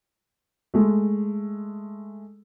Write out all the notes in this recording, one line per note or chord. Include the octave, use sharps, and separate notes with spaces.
G#3 A3